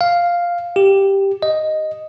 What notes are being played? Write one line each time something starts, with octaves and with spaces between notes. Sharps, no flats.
F5
G4
D#5